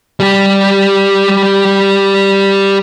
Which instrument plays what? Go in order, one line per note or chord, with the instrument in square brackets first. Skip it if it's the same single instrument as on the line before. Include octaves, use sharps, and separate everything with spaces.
[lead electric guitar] G3 G4